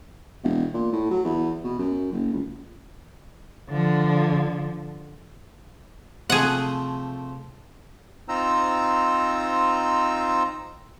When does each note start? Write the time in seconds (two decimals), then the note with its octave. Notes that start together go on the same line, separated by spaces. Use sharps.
0.44 E1
0.74 A#2
0.93 A2
1.11 F#3
1.25 E2
1.64 B2
1.79 F#2
2.12 F#1
2.33 C#2
3.69 D3 F3
6.30 C3 F3 A3 G#4 F#5
8.29 C4 D#4 F4 C5 A#5 E6